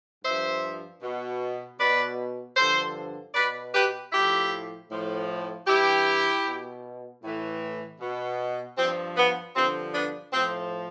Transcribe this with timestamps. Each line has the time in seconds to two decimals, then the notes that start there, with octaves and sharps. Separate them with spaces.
0.24 G2 F3 C5 E5
1.02 B2
1.79 B2 B4 D5
2.57 G2 D3 F3 A4 C5
3.34 B2 B4 D5
3.73 G4 B4
4.12 A2 F3 E4 G4
4.89 A2 F3
5.67 G2 E3 E4 G4
6.45 B2
7.22 A2 E3
8.00 B2
8.78 G2 F3 C4
9.17 B3
9.55 G2 D3 F3 C4
9.94 B3 D4
10.33 A2 F3 C4